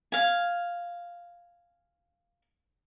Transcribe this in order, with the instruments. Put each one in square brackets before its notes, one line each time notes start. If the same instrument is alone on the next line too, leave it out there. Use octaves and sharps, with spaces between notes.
[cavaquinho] F5 G#5